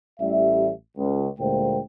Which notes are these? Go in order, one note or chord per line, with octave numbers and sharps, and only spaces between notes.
A1 G3 E5
C#2
D2 A#2 G#3 A#3 C5 G5